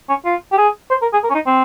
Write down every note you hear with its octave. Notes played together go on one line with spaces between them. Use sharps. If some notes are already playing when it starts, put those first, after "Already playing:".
C#4
F4
G4
G#4
C5
A#4
G#4
A#4
C#4
D#4
C4